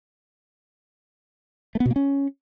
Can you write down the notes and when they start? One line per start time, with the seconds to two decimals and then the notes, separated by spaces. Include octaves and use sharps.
1.75 A3
1.80 B3
1.85 B2
1.91 A#3
1.96 C#4